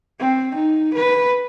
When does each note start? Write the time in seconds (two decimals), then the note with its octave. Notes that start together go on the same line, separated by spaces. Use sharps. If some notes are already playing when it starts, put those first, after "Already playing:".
0.19 C4
0.55 D#4
0.94 B4